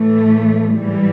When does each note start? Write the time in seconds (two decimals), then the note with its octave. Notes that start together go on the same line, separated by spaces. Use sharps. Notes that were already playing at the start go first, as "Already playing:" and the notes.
Already playing: A2 E3 A3
0.75 G#2 E3 G3